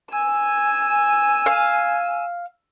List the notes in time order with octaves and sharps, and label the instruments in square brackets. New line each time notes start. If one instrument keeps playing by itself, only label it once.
[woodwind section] G#5 [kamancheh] E6
[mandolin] F5